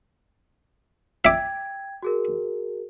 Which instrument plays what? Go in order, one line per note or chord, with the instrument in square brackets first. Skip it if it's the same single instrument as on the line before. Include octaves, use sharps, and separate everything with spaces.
[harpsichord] E5 D6 [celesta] G5 G#6
[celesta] F#4 G#4 A#4